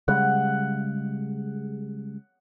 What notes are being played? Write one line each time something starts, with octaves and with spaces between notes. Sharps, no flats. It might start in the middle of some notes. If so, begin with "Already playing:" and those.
C#3 G3 G#3 F#5